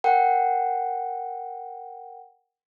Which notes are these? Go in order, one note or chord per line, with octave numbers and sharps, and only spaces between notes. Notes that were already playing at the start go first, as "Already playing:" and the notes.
A#4 F#5 G5